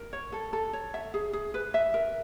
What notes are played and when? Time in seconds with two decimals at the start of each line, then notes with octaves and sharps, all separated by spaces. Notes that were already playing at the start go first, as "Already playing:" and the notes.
Already playing: A#4
0.13 C#5
0.32 A4
0.53 A4
0.73 C#5
0.94 E5
1.14 G#4
1.33 G#4
1.54 B4
1.74 E5
1.94 A#4